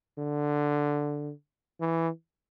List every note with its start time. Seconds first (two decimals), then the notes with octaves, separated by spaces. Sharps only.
0.18 D3
1.80 E3